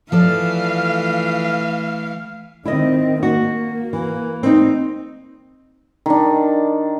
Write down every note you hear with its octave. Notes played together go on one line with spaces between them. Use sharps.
E3 F3 A3 A4 D5 F5
D#3 C4 E4 D#5
A#3 F#4
E3
C4 D#4
D#3 D4